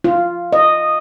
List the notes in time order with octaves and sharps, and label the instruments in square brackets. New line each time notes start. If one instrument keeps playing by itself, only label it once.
[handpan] F4
D#5